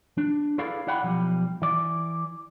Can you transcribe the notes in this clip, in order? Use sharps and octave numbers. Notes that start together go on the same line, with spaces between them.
D4
E4 G#4 A4 B4 D5 F5
E4 D5 F#5 G5 B5
B1 F3 G3
E3 D5